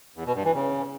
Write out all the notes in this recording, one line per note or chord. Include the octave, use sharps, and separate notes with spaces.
E2
B2
G2
E3
C#3